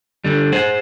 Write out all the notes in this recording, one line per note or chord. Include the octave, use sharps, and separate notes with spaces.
D3 G3
G#4 C5 F#5